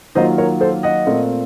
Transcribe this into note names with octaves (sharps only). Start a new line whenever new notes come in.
D#3 F#3 A#3 F4 C5 D#5
A#4 C#5
A4 C5
D#5 F#5
A#2 A3 C4 F4